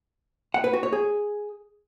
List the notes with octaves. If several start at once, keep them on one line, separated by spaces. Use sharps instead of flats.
F#5
B4
F#4
C#5
G#4